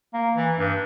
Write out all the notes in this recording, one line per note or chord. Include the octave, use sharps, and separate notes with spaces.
A#3
E3
G2